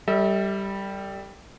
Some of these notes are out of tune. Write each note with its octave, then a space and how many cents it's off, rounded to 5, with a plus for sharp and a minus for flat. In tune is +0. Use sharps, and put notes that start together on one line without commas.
G3 +0 A4 +35 E5 -35